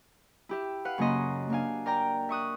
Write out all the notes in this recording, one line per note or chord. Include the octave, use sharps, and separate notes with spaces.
E4 G4 E5
B4 F5 F#5
F#2 C#3 A#3 C#4 D#5 C6
A#3 D4 F5 G#5
A#4 D5 G5 A#5
E5 C#6 D#6 F#6